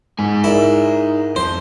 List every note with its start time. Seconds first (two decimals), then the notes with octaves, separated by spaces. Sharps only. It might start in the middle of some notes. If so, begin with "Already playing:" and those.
0.19 G#2 G#3 D#4 G#5
0.44 E4 G#4 A#4 D5
1.36 F2 C5